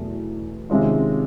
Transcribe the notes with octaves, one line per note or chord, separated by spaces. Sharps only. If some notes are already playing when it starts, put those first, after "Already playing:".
Already playing: E2 B2 F#3 A3
C3 D#3 G#3 C#4 F4